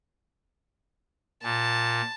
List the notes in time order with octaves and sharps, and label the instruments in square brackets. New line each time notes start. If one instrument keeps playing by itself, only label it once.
[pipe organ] A#2 [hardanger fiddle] A5